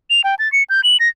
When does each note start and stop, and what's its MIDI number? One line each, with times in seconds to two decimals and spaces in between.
0.10 0.21 101
0.24 0.35 79
0.39 0.51 93
0.52 0.63 97
0.69 0.81 91
0.84 0.97 102
1.00 1.09 94